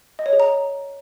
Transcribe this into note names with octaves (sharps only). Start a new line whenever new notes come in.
D#5
C#5
G#4
A#5